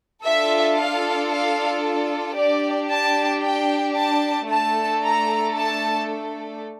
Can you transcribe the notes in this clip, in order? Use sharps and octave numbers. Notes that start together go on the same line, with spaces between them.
D4 F4 A4 E5
F5
F5
D4 G4 D5
A5
G5
A5
A3 D4 A4 A5
A#5
A5